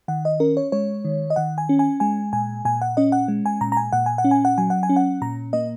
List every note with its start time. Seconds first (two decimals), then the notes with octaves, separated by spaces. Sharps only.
0.08 D#3 F#5
0.25 D#5
0.40 C#4 A#4
0.57 C#5
0.72 G#3 C#5
1.05 D#3
1.30 D#5
1.36 D#3 F#5
1.58 G#5
1.69 C#4
1.79 G#5
2.00 G#3 G#5
2.33 A#2 G#5
2.65 A#2 G#5
2.81 F#5
2.97 C#4 D#5
3.12 F#5
3.28 G#3
3.46 G#5
3.61 A#2 A#5
3.72 A#5
3.77 G#5
3.92 A#2 F#5
4.06 G#5
4.18 F#5
4.24 C#4
4.31 G#5
4.45 F#5
4.58 F#3 G#5
4.70 F#5
4.83 G#5
4.89 C#4
4.96 F#5
5.22 A#2 A#5
5.53 A#3 D#5